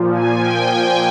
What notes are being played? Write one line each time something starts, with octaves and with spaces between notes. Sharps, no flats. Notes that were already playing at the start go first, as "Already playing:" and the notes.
Already playing: A#2 F3
G#5
G5